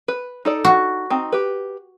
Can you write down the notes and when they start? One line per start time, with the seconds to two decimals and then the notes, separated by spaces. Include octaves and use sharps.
0.08 B4
0.45 D#4 A4 D5
0.65 F#4
1.10 C4 D#4
1.33 G4 B4